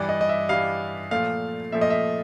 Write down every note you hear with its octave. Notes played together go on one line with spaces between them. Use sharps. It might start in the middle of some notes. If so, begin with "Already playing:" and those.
Already playing: G2 E3 G3 D5
D#5
D#5
E5
G2 E3 G3 F5
A#2 F3 A3 F5
A#2 F3 A3 E5
D#5
E5